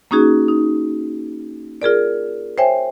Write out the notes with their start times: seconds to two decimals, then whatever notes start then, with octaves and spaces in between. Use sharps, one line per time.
0.11 A#3 C#4 D#4 F#4 G#4
0.48 D#4
1.82 F4 G#4 A#4 D5
2.58 C5 C#5 E5 G5 G#5